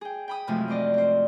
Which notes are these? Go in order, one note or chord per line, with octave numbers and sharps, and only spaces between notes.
G#4 G5
G5 B5 D#6
F#2 A2 C3 F3 G#3 A3
C4 C5 D5 D#5
C4 C5